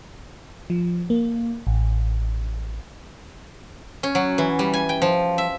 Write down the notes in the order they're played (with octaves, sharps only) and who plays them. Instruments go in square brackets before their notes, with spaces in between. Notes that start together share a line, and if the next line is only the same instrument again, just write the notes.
[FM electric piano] F3
A#3
A1
[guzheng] C#4
F#3
E3
G3
G#5
G5
F3
E5